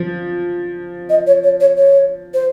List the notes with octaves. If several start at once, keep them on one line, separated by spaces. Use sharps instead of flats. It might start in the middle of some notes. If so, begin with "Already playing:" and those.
Already playing: F3
D#5
C#5
C#5
C#5
C#5
C5